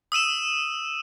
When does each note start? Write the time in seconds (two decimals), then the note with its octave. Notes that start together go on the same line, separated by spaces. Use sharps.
0.12 D#6 E6 D#7 E7